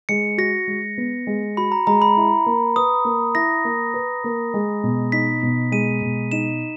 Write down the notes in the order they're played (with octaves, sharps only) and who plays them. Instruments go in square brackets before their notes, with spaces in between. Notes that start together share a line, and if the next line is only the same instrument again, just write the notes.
[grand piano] G#3 [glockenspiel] C#7
[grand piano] F#4 [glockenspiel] A#6
[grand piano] G#3
B3
G#3
[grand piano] F#4 [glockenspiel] B5
[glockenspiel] A#5
[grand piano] G#3 [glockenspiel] A#5
[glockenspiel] B5
[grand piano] E4
A#3
[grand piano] B4 [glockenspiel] D#6
[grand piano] A#3
[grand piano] E4 [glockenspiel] A#6
[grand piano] A#3
B4
A#3
G#3
B2
[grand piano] D#4 [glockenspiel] B6
[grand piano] B2
[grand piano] G#3 [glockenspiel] D#7
[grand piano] B2
[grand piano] D#4 [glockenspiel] E7